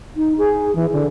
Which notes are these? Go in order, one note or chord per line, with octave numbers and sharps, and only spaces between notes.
D#4
G#4
E3
D3